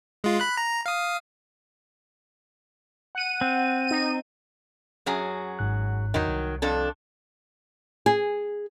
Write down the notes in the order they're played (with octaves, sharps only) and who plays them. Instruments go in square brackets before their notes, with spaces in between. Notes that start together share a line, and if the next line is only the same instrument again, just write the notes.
[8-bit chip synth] G#3 F4
B5 F#6
A#5
F5 D#6
[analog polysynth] F#5 D#7
[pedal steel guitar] C4
[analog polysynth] D#4 D#7
[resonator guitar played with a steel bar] F#2 F#3 G#4
[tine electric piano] G#1 G#2 F#6
[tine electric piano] E2 [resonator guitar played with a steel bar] D#3 F#3
[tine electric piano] C2
[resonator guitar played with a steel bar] F2 D4 A4
[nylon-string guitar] G#4